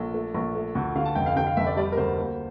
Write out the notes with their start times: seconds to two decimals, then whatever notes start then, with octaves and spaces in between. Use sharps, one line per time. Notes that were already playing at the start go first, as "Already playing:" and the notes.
Already playing: A#1 A4
0.14 A3
0.34 A#1
0.55 A3
0.75 D2
0.96 D3 F5
1.05 A5
1.15 F1 G5
1.26 F5
1.36 D3 G5
1.47 F5
1.57 F1 E5
1.67 D5
1.77 G3 D5
1.92 A#4
1.97 D2 C5
2.18 A#3